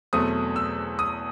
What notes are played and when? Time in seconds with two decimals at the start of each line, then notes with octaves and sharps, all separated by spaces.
0.13 E2 B2 F#3 A3 C4 D#6
0.56 E6
0.99 D#6